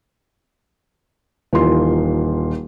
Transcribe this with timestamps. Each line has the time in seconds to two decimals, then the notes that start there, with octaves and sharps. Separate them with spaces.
1.53 D#1 D#3 E3 F4 C6